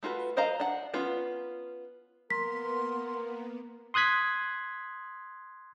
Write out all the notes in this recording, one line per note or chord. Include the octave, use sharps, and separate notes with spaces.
A3 F4 F#4 A#4 B4
A#4 C5 D#5 F5 A#5
D4 F#5
B3 C#4 F4
A#3 B3 A#4 C6 B6
C6 D#6 F#6 G#6 B6